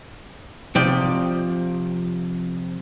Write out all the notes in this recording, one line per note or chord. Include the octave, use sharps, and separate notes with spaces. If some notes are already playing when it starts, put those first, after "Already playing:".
C3 F3 D5 G5